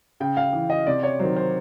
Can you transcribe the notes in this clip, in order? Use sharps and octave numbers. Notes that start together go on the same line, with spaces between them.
C#3 G5
F5
E3
D#5
C3 D5
C#5
D#3 F#3 C5
C5